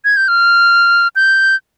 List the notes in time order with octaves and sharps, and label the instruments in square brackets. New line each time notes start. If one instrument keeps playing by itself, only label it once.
[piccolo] G#6
G6
F6
G6